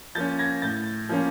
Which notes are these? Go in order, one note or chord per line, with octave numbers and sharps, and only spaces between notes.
F3 A#3 C#4 G6 A6
G#6 A#6
A2 G6 A6
F3 A#3 C#4